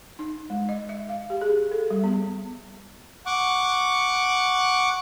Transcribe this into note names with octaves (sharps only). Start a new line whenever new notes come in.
D#4
G#3
D#5
E5
F5
G4
G#4
A4
G3
B3
F#5 C#6 D6